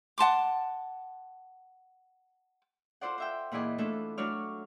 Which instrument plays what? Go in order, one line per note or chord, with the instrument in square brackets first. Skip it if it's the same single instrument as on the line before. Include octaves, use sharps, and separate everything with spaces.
[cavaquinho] F#5 A5 C6 D6
[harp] F4 A4 C5 D5 F#5
C5 E5 G5
A#2 E3 E4 G#4 D5 D#5
E3 A3 D4 F4 A4 E5
F#3 A3 D4 C#5 D5 F6